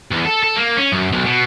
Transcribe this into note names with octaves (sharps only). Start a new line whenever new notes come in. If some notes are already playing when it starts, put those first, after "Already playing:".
E2
A4
A4
A#3
C#4
F#2
B1
B2